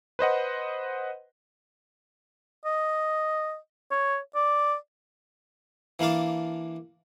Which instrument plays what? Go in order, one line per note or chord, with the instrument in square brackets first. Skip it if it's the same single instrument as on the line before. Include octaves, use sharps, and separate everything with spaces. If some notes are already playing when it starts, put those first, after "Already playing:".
[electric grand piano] B4 C5 D#5 F#5
[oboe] D#5
C#5
D5
[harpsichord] E3 A#3 D4 F5 A5